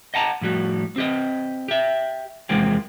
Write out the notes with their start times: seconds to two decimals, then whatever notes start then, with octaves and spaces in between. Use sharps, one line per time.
0.14 D#5 F#5 A5 A#5
0.41 A2 F3 G3 F#4
0.96 C4 G4 D#5
1.68 G4 E5
2.49 E2 C3 F3 G#3 A#3 C4